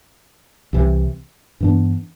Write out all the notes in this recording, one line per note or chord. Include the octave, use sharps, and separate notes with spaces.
C2 C3 E3
G2 E3 B3 D4